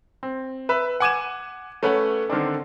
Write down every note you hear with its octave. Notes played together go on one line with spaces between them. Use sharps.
C4
B4 E5 B5
F#5 G#5 D6 G#6 D#7 E7
A3 C#4 B4 C#5 F#5
D3 D#3 C4 D4